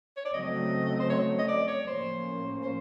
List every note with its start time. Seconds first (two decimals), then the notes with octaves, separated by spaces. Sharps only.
0.17 C#5
0.25 D5
0.33 C#3 F#3 A3 C4 D#5
1.00 C5
1.10 C#5
1.39 D#5
1.48 D5
1.68 C#5
1.87 A2 F3 A#3 C#4 C5
2.63 C5